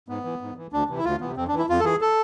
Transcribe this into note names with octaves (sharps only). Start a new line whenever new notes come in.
G#2 B3
E3
G#2
E3
D2 D4
C3 E3
E4
D2 F4
C3 E3 B3
F2 C4
D4
E3
E4
F2 F4
A4
E3 G#4
A4